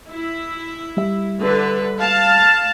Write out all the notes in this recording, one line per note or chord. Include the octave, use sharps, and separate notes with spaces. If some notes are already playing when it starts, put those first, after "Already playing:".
E4
G3 E5
D3 B4
F5 A5